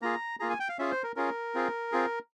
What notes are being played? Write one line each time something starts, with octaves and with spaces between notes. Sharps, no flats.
A#3 F4 G#4 A#5
A#3 F4 G#4 A#5
G#5
G5
F5
C#4 F4 G#4 E5
C5
A#4
C#4 F4 G#4 A#4
C4 F4 G#4
C4 F4 G#4